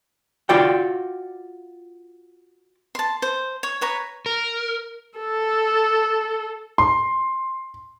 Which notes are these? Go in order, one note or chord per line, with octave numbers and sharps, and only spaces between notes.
F4 F#4 D5 G5
A5 C6
C5
C#5
B4 C#5 A#5
A#4
A4
C6